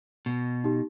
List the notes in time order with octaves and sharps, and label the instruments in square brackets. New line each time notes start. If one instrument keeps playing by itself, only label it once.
[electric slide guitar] B2
[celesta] D#4 G4